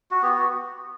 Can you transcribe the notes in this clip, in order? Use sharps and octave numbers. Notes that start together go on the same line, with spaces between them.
F#4
B3 G4
F#4